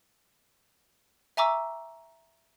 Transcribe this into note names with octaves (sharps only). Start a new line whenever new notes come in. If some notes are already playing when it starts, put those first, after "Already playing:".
E5 G#5 A#5 C#6 D6 E6